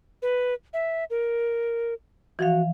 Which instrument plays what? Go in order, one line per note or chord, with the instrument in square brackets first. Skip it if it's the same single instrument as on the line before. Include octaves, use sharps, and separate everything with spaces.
[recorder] B4
E5
A#4
[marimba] E3 F3 F5 [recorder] F#4